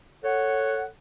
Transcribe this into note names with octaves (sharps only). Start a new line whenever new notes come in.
A4 C#5 F#5